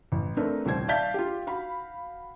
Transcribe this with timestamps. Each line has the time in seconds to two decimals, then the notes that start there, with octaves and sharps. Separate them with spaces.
0.12 A1
0.37 A3 C4 D4 D#4 A#4 B4
0.66 D#1 C2 C5 G#6
0.89 D5 E5 F5 A5 G6 B6
1.14 F4 G4
1.47 F#4 F5 B5